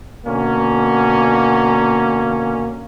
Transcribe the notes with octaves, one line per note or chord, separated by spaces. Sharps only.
B2 D3 A#3 C#4